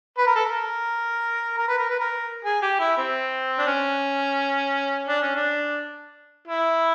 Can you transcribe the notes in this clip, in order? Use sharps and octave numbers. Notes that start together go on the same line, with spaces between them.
B4
A#4
A4
A#4
A#4
B4
A#4
B4
A#4
G#4
G4
E4
C4
D4
C#4
D4
C#4
D4
E4